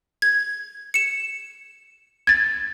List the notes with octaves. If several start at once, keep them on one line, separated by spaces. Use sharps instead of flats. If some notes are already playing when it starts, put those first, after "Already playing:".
G#6
C#7 E7
G#6 A6